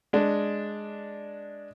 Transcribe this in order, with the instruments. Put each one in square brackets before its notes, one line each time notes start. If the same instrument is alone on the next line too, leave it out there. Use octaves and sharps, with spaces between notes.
[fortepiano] G#3 D4